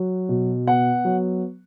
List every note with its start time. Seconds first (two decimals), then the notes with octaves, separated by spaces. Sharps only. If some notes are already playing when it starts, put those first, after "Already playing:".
Already playing: F#3
0.29 B2
0.67 B3 F#5
1.05 F#3